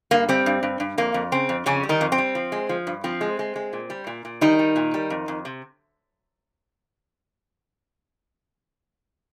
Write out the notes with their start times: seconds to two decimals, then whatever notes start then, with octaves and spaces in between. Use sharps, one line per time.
0.11 G2 A#3
0.29 G3 C4
0.46 G2
0.63 G2
0.80 G2
0.98 F2 A#3
1.14 F2
1.32 C#3 C4
1.49 F2
1.66 F2 C#3 C#4
1.83 G3
1.89 D#3 D#4
2.01 F2
2.12 C4
2.18 G3
2.35 F3
2.52 G#3
2.69 F3
2.87 G2
3.04 F3 C4
3.21 G#3
3.39 G#3
3.56 G#3
3.73 A#2
3.90 G3
4.07 A#2
4.25 A#2
4.41 D#3 G3 D#4
4.59 G3
4.76 A#2
4.94 G3
5.10 F2
5.28 F2
5.45 C3